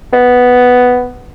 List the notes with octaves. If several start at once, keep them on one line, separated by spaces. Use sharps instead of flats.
B3